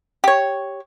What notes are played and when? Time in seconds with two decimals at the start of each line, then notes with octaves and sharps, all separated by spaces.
0.24 G4 C#5